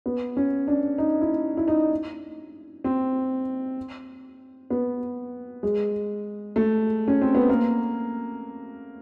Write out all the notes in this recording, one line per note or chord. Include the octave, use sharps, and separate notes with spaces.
B3
C#4
D4
D#4
E4
E4
D#4
C4
B3
G#3
A3
C#4
C4
B3
A#3